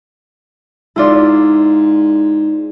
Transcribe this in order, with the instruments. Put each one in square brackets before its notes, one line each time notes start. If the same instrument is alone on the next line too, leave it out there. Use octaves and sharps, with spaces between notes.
[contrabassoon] G#2 [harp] E4 F4 D5